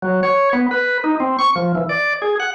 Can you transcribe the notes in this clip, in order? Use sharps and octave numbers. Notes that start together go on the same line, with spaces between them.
F#3
C#5
B3
B4
D#4
C4
C#6
F3
E3
D5
G#4
F#5